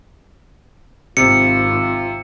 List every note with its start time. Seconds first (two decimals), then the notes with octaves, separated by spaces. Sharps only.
1.17 G#1 C3 F4 C#7